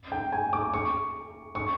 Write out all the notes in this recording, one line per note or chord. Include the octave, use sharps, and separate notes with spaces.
G5
G#5
D6
C#6
C#6